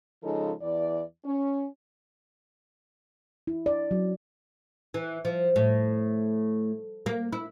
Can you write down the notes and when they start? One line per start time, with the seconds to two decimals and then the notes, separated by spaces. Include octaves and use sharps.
0.23 C#3 F3 G#3 D#4 A4
0.61 E2 E3 D5
1.25 C#4
3.47 E4
3.66 D5
3.91 F#3
4.94 E3
5.25 F3
5.56 A2
7.06 A#3
7.33 E4